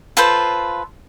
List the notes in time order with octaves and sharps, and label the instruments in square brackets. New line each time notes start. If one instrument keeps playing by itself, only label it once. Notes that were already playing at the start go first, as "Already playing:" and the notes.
[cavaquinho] F4 A4 B4 C5